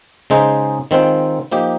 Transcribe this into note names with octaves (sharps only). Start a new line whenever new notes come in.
C#3 G#3 D#4 G#4 C5
D#3 G#3 C4 F4 C5
F3 A#3 D#4 G4